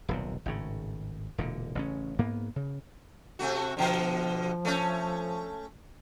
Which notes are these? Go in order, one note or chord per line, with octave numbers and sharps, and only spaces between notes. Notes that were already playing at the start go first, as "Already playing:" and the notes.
D#1 B1 C3
G#1 A2 C#3
E1 A#2 D3
A1 C#3 C#4
G#2 A#3 B3
C#3
C3 A3 F#4
B2 D3 F3
A3 C#4